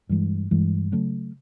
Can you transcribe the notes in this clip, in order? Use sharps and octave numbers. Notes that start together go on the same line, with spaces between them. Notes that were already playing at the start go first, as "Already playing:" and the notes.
G2 E3 G#3
G2 E3 G#3
C#3 F#3 A3